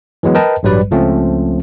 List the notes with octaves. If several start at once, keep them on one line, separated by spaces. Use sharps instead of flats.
E3 F#3 G#3 B3
A#4 B4 D#5 G5 A5
A1 G2 F#3 G3 B4 D5
C#2 F3 A3 C4 C#4